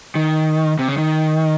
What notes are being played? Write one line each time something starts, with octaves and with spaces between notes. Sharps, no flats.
D#3
C3
C#3
D#3